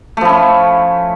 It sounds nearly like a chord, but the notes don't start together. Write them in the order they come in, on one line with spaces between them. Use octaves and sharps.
A3 F3 E4 C#4